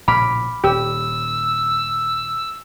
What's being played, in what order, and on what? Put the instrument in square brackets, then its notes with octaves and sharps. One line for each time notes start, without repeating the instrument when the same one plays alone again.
[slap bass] A#1 A2 C#3 [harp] B5 D6 F6
[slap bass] D#1 [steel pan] G4 [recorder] E6